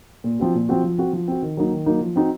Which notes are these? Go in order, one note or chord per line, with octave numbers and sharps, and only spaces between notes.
A#2
F3 C4 F#4
A#2
F3 C4 F#4
F3
C4 F#4
F3
C4 F#4
D#3
F#3 A#3 D#4
D#3
F#3 A#3 D#4
F3
C4 D#4 F#4